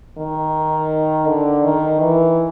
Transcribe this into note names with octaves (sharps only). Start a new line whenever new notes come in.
D#3
D3
D#3
E3